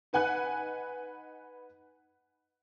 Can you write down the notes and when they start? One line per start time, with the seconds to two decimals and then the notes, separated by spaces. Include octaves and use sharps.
0.13 D#4 B4 F#5 G#5 F#6